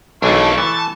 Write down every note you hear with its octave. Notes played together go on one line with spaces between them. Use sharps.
B1 E3 A3 A#3 D4 G#4 A4 C#6
E3 A5